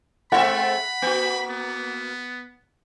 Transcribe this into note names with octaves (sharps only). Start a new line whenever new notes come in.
G#3 C4 E5 F#5 B5
A#3 F#4
B3